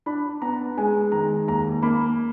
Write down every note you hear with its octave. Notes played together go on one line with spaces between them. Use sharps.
D4 B5
B3 A#5
G#3 G#5
D#3 A#5
D#2 A#5
A#3 B5